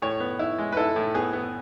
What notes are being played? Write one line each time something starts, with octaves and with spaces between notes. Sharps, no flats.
A2 C#5
B3
E4
G#3
B4
E4 A4
A2
B3 G#4
B3